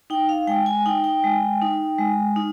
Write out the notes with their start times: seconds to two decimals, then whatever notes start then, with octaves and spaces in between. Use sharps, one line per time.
0.10 D#4 G5
0.29 F5
0.47 G#3 G5
0.66 G#5
0.86 D#4 G5
1.04 G5
1.24 G#3
1.61 D#4
1.99 G#3
2.36 D#4